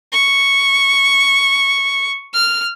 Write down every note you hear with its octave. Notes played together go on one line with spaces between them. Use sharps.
C#6
F6